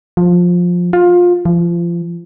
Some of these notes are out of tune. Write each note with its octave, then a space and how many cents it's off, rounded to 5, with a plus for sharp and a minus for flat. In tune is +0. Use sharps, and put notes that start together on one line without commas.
F3 +15
F4 +20
F3 -30